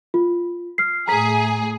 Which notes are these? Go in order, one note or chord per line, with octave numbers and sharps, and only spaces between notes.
F4
F6 C7
A2 G#4 A#5 B6